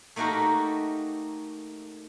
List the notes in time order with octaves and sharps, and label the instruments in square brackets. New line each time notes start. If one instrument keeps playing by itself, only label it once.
[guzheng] A3 A#3 D#4 F#4 G4 A#4